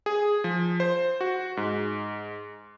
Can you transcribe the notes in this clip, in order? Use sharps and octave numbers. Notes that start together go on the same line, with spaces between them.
G#4
F3
C5
F#4
G#2